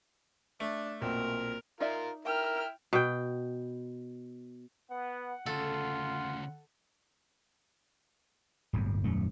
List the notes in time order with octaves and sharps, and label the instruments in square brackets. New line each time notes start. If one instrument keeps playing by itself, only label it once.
[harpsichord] A3 [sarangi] D4
[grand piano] B1 A#2 C4 [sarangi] A#4
[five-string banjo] D#4 D5 E5 [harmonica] F4 A#4
[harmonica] E4 [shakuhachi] A#4 [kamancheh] G5 F6
[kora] B2 G5
[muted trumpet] B3 [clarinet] F#5
[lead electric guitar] D2 C#3 [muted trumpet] F4 [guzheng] A4
[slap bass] D1 G1 G2
D#1 F#2 A3